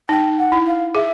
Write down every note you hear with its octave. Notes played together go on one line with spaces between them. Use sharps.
D#4 G5
F#5
E4
F5
G#4 E5